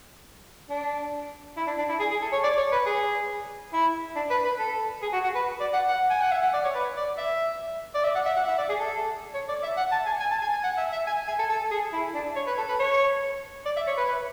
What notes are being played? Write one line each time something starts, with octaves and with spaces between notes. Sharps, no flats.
D4
E4
D4
D4
E4
G#4
G#4
A4
C#5
D5
C#5
B4
G#4
E4
D4
B4
B4
A4
G#4
F#4
F#4
B4
D5
F#5
F#5
G#5
F#5
E5
F#5
D5
C#5
B4
D5
E5
D5
E5
F#5
E5
F#5
E5
D5
G#4
A4
C#5
D5
E5
F#5
A5
G#5
G#5
A5
G#5
G#5
F#5
E5
E5
G#5
G#5
A4
A4
G#4
E4
D4
C#5
B4
A4
B4
C#5
D5
E5
C#5
B4
B4